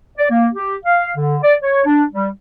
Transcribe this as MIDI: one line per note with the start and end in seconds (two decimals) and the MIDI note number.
0.18 0.28 74
0.30 0.48 58
0.55 0.75 67
0.85 1.12 77
1.16 1.37 50
1.42 1.55 74
1.63 1.85 73
1.85 2.04 62
2.13 2.29 55